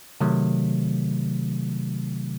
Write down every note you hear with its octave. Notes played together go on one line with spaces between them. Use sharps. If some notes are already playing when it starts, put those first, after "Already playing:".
C3 D#3 F#3 A3